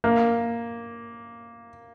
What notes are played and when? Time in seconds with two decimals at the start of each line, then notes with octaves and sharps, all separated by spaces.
0.04 A#3